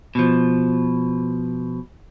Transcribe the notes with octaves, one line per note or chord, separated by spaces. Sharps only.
B2 F3